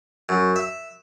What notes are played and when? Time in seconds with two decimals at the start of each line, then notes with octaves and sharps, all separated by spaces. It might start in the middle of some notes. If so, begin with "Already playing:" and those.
0.29 F#2
0.56 E5